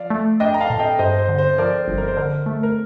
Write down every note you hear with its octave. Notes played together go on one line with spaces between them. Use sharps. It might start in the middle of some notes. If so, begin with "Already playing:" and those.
Already playing: F3 D5 F5
A3
D4 D#5 G5
A#5
F5 A5
A#2
D#5 G5
G2 C5 D#5
C5
D3
C5
F3 A#4 D5
C5
G1
A#4
C5
D3 A#4
A3
A#4